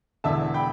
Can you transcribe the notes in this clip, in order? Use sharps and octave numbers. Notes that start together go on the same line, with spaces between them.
E1 E2 D3 E5 A5
G5 B5